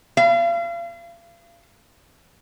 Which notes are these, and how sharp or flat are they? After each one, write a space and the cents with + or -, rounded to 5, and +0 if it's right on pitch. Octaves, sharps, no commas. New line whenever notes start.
F5 -40